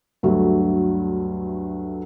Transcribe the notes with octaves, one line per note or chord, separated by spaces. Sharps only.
D2 G2 F#3 A3